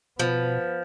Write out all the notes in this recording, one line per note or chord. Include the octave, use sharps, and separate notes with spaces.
B2 F3 B3